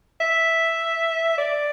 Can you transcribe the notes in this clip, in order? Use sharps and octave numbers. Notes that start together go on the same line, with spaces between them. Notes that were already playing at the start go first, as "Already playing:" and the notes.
E5
D5